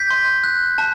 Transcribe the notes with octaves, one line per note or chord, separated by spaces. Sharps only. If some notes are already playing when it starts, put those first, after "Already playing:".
Already playing: G6 B6
C6
F#6
A5